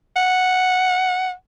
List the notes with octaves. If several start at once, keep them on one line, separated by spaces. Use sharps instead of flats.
F#5